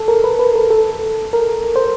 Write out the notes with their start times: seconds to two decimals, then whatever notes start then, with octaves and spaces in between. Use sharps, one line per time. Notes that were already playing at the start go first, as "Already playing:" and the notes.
Already playing: A4
0.08 A#4
0.24 B4
0.39 B4
0.56 A#4
0.70 A4
1.33 A#4
1.76 C5